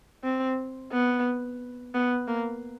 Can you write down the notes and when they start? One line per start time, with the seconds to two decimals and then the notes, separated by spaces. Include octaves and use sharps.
0.24 C4
0.92 B3
1.94 B3
2.28 A#3